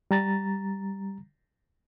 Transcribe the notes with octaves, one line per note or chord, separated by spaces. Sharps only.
G3 A#5 A6